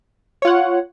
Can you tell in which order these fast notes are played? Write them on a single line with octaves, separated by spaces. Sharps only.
C#5 F4 F#5